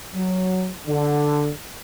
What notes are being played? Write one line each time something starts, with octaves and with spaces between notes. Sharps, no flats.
F#3
D3